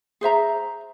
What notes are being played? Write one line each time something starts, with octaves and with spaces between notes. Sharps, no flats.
G#4 C5 E5 A#5